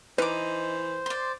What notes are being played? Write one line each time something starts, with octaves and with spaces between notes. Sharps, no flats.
E3 D#4 B4 C5 D6
D5 C6